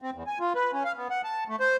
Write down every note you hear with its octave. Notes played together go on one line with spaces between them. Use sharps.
C4
E2
G#5
F4
B4
C#4
F5
B3
F#5
A5
A3
C5